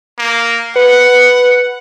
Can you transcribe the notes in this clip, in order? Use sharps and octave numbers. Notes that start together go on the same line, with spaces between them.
A#3
B4 F#5